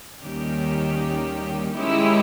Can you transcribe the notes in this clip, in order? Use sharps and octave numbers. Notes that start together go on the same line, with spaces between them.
D#2 D#3 G3 C#4 G4
D#3 G#3 C#4 E4 G4